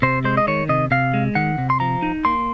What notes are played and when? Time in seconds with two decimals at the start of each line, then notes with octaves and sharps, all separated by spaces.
0.02 C3 C5
0.24 G#3 C5
0.37 D#5
0.47 D#3 C#5
0.69 C3 D#5
0.91 C3 F5
1.14 G#3
1.35 D#3 F#5
1.58 C3
1.70 C6
1.80 F3 A#5
2.02 D#4
2.25 A#3 C6